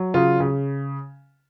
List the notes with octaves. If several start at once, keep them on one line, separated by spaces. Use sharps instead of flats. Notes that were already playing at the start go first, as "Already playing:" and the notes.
Already playing: F#3
C#3 F4
C#3